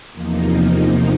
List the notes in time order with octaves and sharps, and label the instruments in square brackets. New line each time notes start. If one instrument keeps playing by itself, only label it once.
[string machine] E2 C3 F3 A#3 D#4